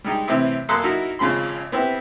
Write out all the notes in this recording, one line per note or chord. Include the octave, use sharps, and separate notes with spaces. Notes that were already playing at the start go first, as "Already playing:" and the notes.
G3 G#3 D#4 G4
A2 C3 E3 C4
F#2 A#3 A4 C6 D#6 F#6
D#4 E4 F#4 A#4
G#1 C#3 F3 B5 C6
B3 C4 E4 G4